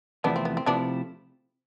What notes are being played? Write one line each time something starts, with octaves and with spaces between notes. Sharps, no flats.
E2 C3 F3 A3 B3 D4 E4
C4
B3
C4
C3 F3 A3 B3 D4 E4